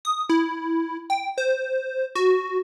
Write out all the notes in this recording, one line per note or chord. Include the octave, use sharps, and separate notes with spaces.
D#6
E4
G5
C5
F#4